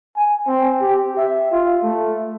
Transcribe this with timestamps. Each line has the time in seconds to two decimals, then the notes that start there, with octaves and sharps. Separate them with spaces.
0.16 G#5
0.47 C4
0.81 G4
1.17 E5
1.51 F4
1.83 A3